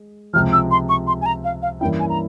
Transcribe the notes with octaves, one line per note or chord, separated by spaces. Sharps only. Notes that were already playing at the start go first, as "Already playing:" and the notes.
Already playing: G#3
C#2 C3 F3 F6
E6
C6
C#6
C6
G#5
A#5
F5
F5
G2 E3 A#3 C#4 E4 G5
G#5
A#5